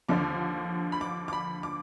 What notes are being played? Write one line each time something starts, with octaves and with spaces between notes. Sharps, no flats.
D#2 D3 F3 D6
B5
D6
D6
B5
D6